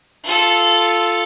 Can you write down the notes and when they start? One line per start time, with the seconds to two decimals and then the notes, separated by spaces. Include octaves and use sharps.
0.24 F4 A4